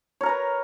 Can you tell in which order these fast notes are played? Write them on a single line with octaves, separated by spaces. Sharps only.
C#5 A#4 A#5 B4